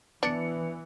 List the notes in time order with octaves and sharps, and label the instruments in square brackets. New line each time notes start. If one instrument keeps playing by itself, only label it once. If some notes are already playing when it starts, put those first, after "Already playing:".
[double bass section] E3 [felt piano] B3 C#7 [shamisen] D4